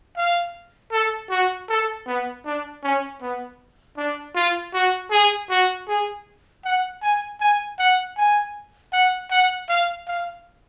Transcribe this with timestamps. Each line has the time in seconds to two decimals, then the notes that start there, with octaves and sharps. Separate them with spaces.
0.17 F5
0.92 A4
1.30 F#4
1.69 A4
2.07 B3
2.45 D4
2.83 C#4
3.21 B3
3.97 D4
4.35 F4
4.73 F#4
5.12 G#4
5.50 F#4
5.88 G#4
6.65 F#5
7.02 G#5
7.40 G#5
7.79 F#5
8.17 G#5
8.93 F#5
9.31 F#5
9.69 F5
10.07 F5